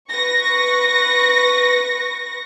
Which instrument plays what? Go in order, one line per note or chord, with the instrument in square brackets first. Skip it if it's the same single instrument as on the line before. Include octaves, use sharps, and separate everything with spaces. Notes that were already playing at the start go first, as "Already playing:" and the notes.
[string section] B4 C#6 A#6